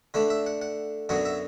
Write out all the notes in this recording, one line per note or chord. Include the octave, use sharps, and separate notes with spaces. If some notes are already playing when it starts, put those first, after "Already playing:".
D3 A3 D4 B4
E5
F#5
F#5
F#2 D3 F#3 B3 F#5
E5